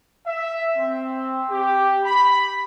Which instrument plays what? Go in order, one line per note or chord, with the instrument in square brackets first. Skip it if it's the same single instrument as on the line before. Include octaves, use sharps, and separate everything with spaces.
[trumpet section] E5
C4
G4
B5